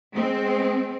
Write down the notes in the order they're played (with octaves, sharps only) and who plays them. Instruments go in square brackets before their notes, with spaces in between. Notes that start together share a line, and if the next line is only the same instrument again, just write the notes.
[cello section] G#3 C4